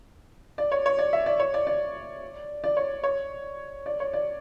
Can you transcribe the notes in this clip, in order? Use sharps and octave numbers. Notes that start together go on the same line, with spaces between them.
D5
C#5
C#5
D5
E5
D5
C#5
D5
D5
D5
C#5
C#5
D5
C#5
D5